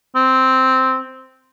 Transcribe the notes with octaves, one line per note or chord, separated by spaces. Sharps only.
C4